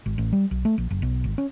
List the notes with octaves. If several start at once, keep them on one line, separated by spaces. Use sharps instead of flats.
G#1
A1
G3
B1
A3
A#1
F#1
B1
G#1
C#4